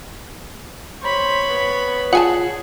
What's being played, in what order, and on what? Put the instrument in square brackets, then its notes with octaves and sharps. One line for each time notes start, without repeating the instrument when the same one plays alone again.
[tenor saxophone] C5 [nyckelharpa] C#5 B5
[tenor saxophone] B3
[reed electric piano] F4 [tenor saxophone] G#4 [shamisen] F#5 G#5 A5